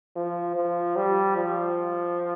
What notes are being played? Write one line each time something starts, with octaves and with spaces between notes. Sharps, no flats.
F3
F3
G3
F3